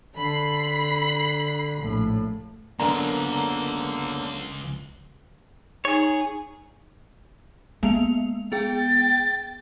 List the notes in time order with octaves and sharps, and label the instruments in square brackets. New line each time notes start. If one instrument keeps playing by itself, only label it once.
[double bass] D3 [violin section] B5 C7
[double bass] A#1 A2
[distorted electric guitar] C#2 [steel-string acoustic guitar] F#2 B3 D4 [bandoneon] D3 A#3 [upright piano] A#5
[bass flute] D#4 [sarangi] G#4 [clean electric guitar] C#5
[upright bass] G#3 [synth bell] A#3 B3 F7
[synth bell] B3 G#4 [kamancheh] G5 [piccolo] A6